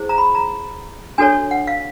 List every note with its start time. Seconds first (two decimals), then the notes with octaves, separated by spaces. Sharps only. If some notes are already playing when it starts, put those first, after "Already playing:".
Already playing: E4 G#4 C5
0.09 A#5
0.18 B5
0.35 A#5
1.18 D4 F#4 A4 C#5 G#5
1.51 F#5
1.67 F5